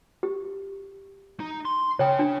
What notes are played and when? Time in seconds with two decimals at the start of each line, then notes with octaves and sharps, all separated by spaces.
0.23 G4
1.40 D#4
1.65 C6
1.99 C#3 C#5 G5
2.19 D4